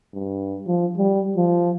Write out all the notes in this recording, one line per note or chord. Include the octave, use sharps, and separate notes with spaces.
G2
F3
G3
F3